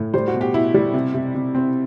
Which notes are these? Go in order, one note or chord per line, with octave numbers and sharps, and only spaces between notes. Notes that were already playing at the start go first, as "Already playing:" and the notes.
Already playing: A2
G3 C5
F#4
B2
G4
B2 E4
G3
C3
C3
C3
C4